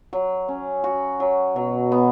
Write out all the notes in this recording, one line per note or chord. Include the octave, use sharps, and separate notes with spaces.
F#3
C#4
F#4
F#3
B2 F#3
B3